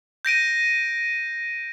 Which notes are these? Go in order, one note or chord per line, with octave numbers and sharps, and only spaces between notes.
G6 A#6 D7 D#7